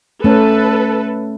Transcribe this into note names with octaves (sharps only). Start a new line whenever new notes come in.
A3 C#4 A4 B4 C#5